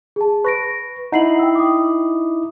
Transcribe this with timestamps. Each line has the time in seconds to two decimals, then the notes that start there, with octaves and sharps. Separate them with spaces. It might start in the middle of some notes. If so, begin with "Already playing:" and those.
0.16 G#4 A5
0.45 B4 C#6 A#6 D7
1.12 D#4 E4 F#5 C7 F#7
1.39 G5 E6
1.55 D6 D#6